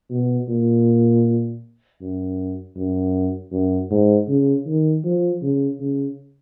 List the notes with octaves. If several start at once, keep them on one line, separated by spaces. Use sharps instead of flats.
B2
A#2
F#2
F#2
F#2
G#2
C#3
D#3
F3
C#3
C#3